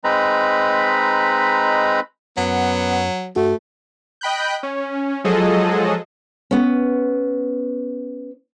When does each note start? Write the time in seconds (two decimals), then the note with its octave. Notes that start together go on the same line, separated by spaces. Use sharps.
0.04 G#3 C4 D#4 B4 A#5 B5
2.37 F#2 F#3 B3
3.36 G2 A3 F#4
4.21 D#5 G5 B5 F#6 G6
4.63 C#4
5.24 F3 F#3 G#3 G#4 A4 D#5
6.51 B3 C#4